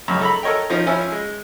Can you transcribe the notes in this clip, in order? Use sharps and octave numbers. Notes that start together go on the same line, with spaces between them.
C#2 F#2
A4 A#5 B5
A4 A#4 C#5 D#5 G5
F3 C#4 D#4
F3 C#4 E4 G#5 E6
G#3